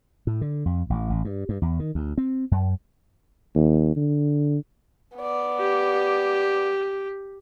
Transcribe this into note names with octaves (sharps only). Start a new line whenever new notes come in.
A2
D3
F2
A1
A1
G2
G2
E2
D#3
D2
C4
F#2
D#2
D3
B3 D5
G4